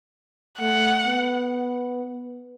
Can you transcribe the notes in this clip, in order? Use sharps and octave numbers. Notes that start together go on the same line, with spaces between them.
A3 F#5
B3